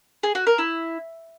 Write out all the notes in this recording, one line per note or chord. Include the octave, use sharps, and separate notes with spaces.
G#4
F#4
A#4
E4